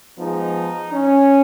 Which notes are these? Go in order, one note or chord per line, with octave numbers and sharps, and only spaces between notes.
F3 G#3 B3 D#4
C#4